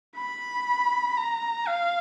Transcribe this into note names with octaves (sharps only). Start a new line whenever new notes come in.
B5
A#5
F5